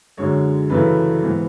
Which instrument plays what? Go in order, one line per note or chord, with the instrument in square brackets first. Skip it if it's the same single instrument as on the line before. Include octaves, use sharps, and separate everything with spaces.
[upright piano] F#2 D3 G#3 C#5
F#2 C#3 E3 A3 E4 B4
G#2 E3 B3